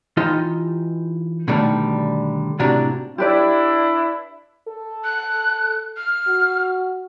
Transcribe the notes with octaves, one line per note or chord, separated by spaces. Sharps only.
E3 D#4 F4 G4 D#5 C6
B2 D3 D#3 G3 A3
A2 C3 D4 F#4 D5 A#5
D4 E4 G4 B4 D5
A4
F#6
F6
F#4